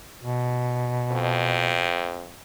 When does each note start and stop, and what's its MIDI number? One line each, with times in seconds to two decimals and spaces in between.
0.23 1.95 47
1.12 2.31 41